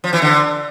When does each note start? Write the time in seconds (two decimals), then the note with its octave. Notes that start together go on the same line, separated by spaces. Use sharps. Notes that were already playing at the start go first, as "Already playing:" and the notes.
0.04 F3
0.13 E3
0.22 D3